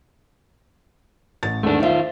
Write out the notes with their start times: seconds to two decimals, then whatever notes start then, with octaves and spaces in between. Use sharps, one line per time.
1.43 A1 A6
1.63 G#1 E2 A3 D4
1.80 D#3 F4 C5 E5